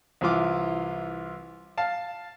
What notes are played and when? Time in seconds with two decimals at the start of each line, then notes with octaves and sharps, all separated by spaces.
0.21 C2 E3 F4 D6
1.78 F5 A5